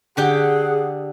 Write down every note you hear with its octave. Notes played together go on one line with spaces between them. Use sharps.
D3 G4 G#4 F#5 G5